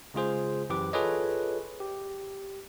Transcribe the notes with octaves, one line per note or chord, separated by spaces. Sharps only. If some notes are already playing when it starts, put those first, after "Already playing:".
C#3 G#3 F4 G#4 C5
F#2 E3 G4 B4 D6
F4 G#4 A4 B4 C#5 D#5
G4